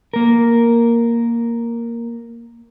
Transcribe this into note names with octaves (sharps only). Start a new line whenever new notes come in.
A#3 A#4